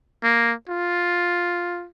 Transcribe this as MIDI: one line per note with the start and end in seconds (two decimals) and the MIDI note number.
0.23 0.54 58
0.68 1.87 65